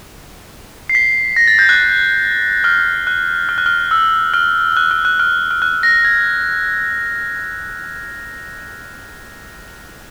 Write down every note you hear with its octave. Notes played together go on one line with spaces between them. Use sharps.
C7
B6
A#6
A6
G6
F#6
F6
F#6
F6
F#6
F6
E6
F6
F#6
F6
F#6
F6
F6
F#6
A#6
G#6